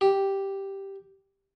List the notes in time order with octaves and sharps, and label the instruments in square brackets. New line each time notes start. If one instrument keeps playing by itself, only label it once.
[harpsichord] G4